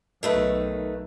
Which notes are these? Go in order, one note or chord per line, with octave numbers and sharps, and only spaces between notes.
B1 D#3 F#3 A3 B4